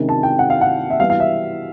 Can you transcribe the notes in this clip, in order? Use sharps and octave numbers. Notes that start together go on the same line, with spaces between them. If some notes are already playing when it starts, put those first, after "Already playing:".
Already playing: C3 D#3 G#3 C#4
A5
G5
F#5
F5
F#5
E5
E3 G3 B3 F5
F5
E5